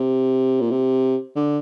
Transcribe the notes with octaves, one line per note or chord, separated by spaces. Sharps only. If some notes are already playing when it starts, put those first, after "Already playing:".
Already playing: C3
A#2
C3
D3